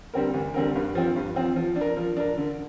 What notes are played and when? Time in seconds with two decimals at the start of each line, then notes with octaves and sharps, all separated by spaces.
0.14 D3 G3 C4 A#4
0.34 D2
0.54 D3 G3 C4 A#4
0.76 G2
0.95 F3 C4
1.16 G2
1.36 F3 C4
1.56 F3
1.76 D4
1.81 A#4
1.97 F3
2.17 D4 A#4
2.38 D3